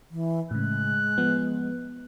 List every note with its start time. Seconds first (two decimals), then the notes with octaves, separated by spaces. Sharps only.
0.11 E3
0.51 A2 C#3 G#3 F#6
1.18 F3 B3